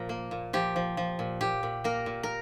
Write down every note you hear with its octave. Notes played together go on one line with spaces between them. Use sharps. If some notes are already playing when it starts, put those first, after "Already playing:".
Already playing: A#2 F3 A#4
A#3
A#2
F3 G4
F3
F3
A#2
A#2 G4
A#2
A#3 A#4
A#2
A#4